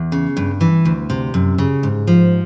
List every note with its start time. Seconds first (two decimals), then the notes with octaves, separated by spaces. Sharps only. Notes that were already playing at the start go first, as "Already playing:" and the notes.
Already playing: E2
0.12 C#3
0.37 G2
0.61 E3
0.85 D2
1.10 C3
1.34 F#2
1.58 C#3
1.83 G#2
2.08 F3